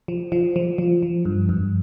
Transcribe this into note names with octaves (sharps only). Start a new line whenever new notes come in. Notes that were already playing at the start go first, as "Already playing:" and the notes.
F3
F3
F3
F3
F3
G2
G2